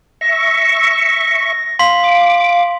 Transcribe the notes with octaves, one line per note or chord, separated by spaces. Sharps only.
E5 C#6 A#6
F5 C6 B6 F#7
D6